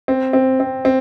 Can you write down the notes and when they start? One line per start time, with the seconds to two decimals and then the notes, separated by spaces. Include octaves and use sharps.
0.08 C4
0.33 C4
0.60 C4
0.85 C4